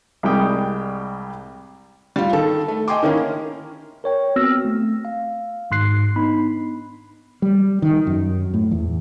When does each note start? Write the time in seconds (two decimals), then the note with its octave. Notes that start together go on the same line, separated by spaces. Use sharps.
0.23 C2 G3 G#3 G4 G5 D#6
2.16 G3 F4
2.33 D#3 A4
2.68 A3
2.88 D#5 G5 G#5 C6 D6
3.03 D#3 A#3 C#4 E4 A#4
4.04 A#4 C#5 G5
4.36 B3 C4 F#4 E6 F6 A#6
4.65 A3
5.05 F5
5.71 G#1 G#2 C6 F#6 C7
6.16 B3 D4 D#4 B5
7.42 G3
7.82 D#3
8.07 F#2
8.54 A2
8.71 E2